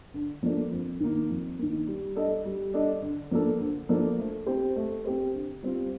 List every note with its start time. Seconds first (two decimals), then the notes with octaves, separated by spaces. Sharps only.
0.14 D3
0.43 F3 A#3 D4 A4
0.71 F2
1.00 D#3 A#3
1.29 F2
1.58 D#3 A#3
1.87 G3
2.16 D4 A4 D#5
2.45 G3
2.74 D4 A4 D#5
3.02 D3
3.31 F3 A#3 D4 A4
3.60 D3
3.89 F3 A#3 D4 A4
4.18 A3
4.46 C4 G4 C5
4.76 A3
5.05 C4 G4 C5
5.34 D3
5.62 G3 C4 F4